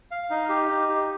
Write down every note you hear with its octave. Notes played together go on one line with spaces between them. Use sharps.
F5
D#4
G4
D#4
G4